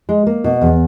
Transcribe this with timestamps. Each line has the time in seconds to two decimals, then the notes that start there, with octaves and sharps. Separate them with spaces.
0.09 G#3
0.27 A#3
0.44 B2
0.61 E2